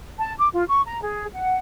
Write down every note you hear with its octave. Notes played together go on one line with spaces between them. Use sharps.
A5
D6
F4
C#6
A#5
G#4
F#5